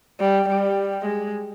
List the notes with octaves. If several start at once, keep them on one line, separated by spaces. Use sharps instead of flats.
G3
G3
G#3